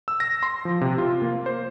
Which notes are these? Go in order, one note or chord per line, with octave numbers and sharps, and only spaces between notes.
E6
A#6
C6
F3
C3
F4
A#3
C5